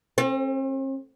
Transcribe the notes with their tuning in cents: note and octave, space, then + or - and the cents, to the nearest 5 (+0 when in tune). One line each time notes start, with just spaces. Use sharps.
C4 +45